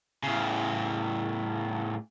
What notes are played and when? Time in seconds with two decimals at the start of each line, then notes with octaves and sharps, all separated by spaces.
0.23 A2 C#3